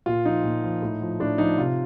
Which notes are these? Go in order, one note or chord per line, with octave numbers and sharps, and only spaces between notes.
A#2 F4
F3 D#4
A#2
F3
A2
F3
A2 D4
F3 D#4
C3 F4